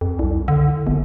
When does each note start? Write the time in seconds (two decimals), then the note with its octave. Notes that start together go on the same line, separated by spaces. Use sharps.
0.01 F2
0.19 C2
0.48 D3
0.87 G1